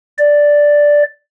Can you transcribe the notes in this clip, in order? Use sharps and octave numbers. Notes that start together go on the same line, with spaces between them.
D5